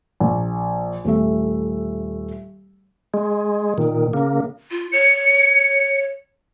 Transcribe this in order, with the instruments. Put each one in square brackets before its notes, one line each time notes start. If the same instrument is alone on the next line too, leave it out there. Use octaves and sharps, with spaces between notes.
[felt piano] A#1
D#1 A3 E5
[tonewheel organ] G#3
A#2 D#3
C#3 A#3
[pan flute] F4
[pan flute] C#5 [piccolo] C#7